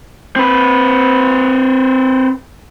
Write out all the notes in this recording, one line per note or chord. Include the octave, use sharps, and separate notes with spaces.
C4 B4